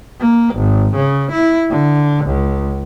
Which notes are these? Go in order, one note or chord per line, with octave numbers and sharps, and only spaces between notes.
A#3
G#1
C#3
E4
D3
C#2